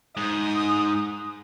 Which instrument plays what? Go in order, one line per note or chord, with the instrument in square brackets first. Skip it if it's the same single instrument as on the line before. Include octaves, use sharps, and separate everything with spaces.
[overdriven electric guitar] G#2 [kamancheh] D#6